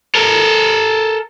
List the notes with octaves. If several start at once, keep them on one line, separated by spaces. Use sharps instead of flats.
A4 A#4